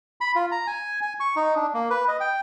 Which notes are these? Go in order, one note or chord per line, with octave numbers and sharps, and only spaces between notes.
B5
F4
A#5
G#5
G#5
C#6
D#4
D4
A#3
B4
D#5
G5